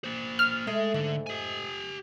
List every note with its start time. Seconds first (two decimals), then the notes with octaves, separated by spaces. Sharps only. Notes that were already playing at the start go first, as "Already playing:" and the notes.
0.04 A#3 C5
0.39 F6
0.67 G#3 A3
0.94 G#2 D3
1.27 G4 G#5